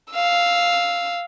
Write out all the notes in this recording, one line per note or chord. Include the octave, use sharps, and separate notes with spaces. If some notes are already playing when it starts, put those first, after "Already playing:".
F5 E6